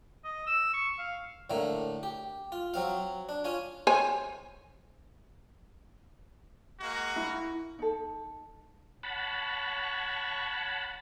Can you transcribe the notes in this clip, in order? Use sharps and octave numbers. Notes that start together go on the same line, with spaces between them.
D#5
E6
C#6
F5
A2 D3 A3 A#3
G4
F4
F#3 C4 F5
D4
C#4 F4 G#5
C5 C#5 G#5
G#3 A#3 F#4
E4
D#4 A4
C#5 F#5 A5 B5